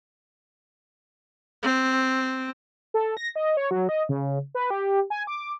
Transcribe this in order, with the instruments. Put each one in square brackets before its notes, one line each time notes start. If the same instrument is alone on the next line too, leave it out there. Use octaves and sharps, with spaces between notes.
[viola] C4
[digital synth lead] A4
A#6
D#5
C#5
F#3
D#5
C#3
B4
G4
G#5
D6